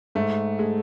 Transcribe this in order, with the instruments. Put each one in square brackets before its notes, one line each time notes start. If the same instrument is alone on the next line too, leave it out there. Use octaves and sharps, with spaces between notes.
[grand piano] G#2 [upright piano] A3
[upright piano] G#3 [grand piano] A3